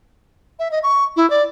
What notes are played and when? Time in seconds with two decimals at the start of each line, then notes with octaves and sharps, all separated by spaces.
0.59 E5
0.71 D#5
0.83 C#6
1.16 E4
1.30 D5